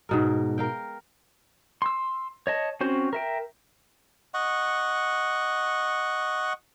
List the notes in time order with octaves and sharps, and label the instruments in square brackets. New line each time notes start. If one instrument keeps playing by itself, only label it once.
[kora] G#2 B2 A#4
A#4 F5 G5
[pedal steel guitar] C6 E6
C#5 D#5 A5
C4 C#4 F#4 C5
A#4 E5 G5
[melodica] D#5 F#5 C#6